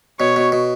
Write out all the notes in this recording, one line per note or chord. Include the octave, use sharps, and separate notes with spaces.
B2 C#5
B2
B2